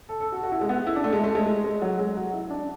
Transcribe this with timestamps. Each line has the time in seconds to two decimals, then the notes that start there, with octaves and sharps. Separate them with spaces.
0.09 A4
0.20 A4
0.32 F#4
0.43 F#4
0.52 E4
0.61 G#3
0.69 B3
0.87 E4
0.96 D4
1.04 A3
1.13 G#3
1.24 A3
1.35 G#3
1.47 G#3
1.64 G#3
1.82 F#3
1.99 G#3
2.17 F#4
2.33 E4
2.50 D4